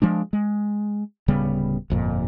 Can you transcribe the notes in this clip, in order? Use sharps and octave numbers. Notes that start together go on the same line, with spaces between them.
F3 G#3 D4
G#3
D1 C#3 G3 B3
G1 F2 A#2